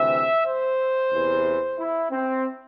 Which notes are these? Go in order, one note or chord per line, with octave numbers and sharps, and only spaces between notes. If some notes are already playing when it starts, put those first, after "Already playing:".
Already playing: D2 C3 E3 E5
C5
E2 C3 E3
E4
C4